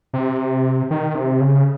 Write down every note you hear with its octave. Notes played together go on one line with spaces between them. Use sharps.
C3
D#3
C3
C#3